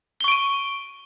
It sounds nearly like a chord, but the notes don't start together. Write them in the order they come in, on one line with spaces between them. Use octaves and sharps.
G7 C#6 D7 D#7